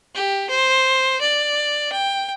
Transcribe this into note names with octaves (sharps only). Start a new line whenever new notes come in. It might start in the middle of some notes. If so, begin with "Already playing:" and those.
G4
C5
D5
G5